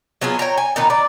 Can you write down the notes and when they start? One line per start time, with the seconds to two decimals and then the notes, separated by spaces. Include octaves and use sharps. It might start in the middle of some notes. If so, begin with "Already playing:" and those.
0.21 F#3 B3 F4 G#4
0.39 C#5 G5 A#5
0.58 G#5
0.76 A#2 D#3 D#4 B4
0.90 D5